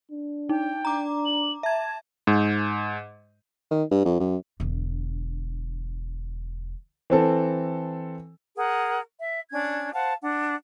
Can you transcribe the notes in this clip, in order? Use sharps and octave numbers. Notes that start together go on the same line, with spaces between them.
D4
D#4 G5
D4 A#5 D6
F#7
E5 A5 G#6
G#2
D#3
G2
F2
F#2
E1 D3
E3 C4 A4
G#4 A#4 F#5
E5
C#4 D4 G#6
C5 F5 F#5 A5
D4 F#5